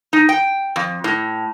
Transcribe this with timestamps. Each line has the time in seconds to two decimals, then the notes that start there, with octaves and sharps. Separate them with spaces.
0.13 D#4
0.29 G5
0.76 F2
1.04 A2